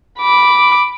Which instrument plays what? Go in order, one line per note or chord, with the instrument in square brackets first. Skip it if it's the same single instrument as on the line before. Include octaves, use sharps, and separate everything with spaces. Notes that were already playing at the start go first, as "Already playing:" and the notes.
[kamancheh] B5 D6